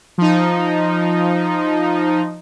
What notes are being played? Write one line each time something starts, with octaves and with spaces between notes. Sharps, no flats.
F3 D#4